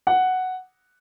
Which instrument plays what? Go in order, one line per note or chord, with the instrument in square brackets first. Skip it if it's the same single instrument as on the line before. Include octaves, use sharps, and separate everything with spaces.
[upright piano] F#5